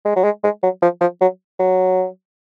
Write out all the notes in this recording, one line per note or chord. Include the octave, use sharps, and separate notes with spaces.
G#3
F#3
G#3
G#3
F#3
F3
F3
F#3
F#3